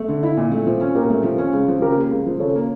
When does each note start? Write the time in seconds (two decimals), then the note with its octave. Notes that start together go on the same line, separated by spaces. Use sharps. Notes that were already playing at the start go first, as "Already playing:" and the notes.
Already playing: A3
0.08 D3
0.23 E4
0.37 A#2
0.52 A3
0.67 F3
0.81 C#4
0.95 A#2 G4 A#4
1.10 A3
1.24 F3
1.38 C#4
1.53 C#2
1.68 F3
1.82 C#3 G4 A#4
1.96 A#3
2.11 C#2
2.26 F3
2.40 C#3 A4 C#5
2.55 A#3